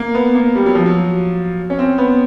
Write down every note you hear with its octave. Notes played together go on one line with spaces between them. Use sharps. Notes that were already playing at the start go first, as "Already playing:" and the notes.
Already playing: A#3
B3
A#3
G3
F#3
F3
F#3
C#4
C4
B3